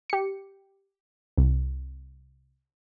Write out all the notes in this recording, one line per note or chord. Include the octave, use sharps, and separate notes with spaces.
G4 C#7
C2